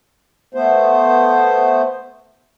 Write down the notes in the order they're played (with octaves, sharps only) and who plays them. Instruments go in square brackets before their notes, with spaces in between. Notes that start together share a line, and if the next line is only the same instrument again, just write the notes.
[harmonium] A3 B3 C5